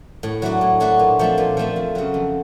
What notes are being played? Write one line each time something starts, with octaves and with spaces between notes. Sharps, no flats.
A2
F#3 A3 D4 F#4
A2
F#3 A3 D4 F#4
A#2
F3 A3 C4
A#2
F3 A3 C4
F2
C#3 F#3
F2